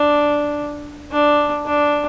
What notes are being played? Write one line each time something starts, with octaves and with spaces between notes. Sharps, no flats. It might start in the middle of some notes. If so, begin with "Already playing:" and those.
Already playing: D4
D4
D4